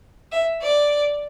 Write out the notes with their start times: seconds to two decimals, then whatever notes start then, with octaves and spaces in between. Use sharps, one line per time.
0.32 E5
0.63 D5